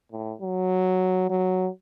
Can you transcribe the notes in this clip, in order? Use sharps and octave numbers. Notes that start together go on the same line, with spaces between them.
A2
F#3
F#3